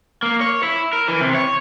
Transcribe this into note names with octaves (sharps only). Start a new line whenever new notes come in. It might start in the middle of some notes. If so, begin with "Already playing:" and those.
A#3
C#5
E4
A#4
E3
C3
C#5